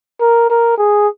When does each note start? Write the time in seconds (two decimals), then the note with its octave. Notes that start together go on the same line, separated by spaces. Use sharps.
0.20 A#4
0.50 A#4
0.78 G#4